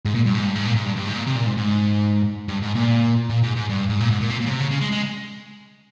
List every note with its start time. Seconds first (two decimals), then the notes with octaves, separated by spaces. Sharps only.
0.05 G#2
0.15 A#2
0.26 G2
0.35 G#2
0.45 G2
0.55 G#2
0.65 A#2
0.76 G#2
0.86 G2
0.97 G2
1.06 G#2
1.16 A#2
1.27 C3
1.36 A#2
1.47 G#2
1.57 G#2
2.48 G2
2.62 G#2
2.75 A#2
3.30 A#2
3.43 G#2
3.56 G#2
3.69 G2
3.89 G#2
4.00 A#2
4.10 G#2
4.21 A#2
4.30 C3
4.41 A#2
4.46 C#3
4.51 C3
4.61 C#3
4.71 C#3
4.81 G#3
4.92 G#3